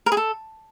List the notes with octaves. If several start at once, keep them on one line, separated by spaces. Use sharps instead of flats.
A#4
G#4
A4